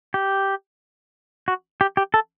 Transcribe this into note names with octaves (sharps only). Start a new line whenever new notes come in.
G4
F#4
G4
G4
A4